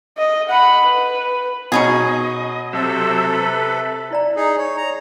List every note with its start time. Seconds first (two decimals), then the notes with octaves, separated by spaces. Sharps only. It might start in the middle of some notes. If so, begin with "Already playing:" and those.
0.18 D#5
0.49 F#5 B5
0.88 B4
1.72 B2 C#4 D#4 G#4 D#5
2.73 C3 F#3 C4 A4 E5
3.33 B4
4.11 E4 D5 A#5
4.36 D#4 G#4
4.58 C#5
4.77 A#5